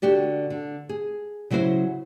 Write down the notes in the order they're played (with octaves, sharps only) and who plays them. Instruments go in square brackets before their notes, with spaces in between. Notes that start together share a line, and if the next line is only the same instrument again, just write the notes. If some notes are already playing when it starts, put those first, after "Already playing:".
[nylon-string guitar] D3 F#4 G4 D5
D3
G#4
C#3 F#3 E4 F#4 C5